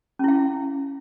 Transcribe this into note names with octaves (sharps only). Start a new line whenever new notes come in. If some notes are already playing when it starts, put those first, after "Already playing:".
C#4 E4 F5